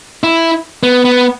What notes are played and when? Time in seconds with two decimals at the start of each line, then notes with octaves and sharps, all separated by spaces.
0.23 E4
0.83 B3
1.05 B3